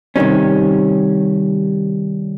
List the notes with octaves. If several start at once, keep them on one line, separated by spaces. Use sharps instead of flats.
C3 D#3 G3 C#4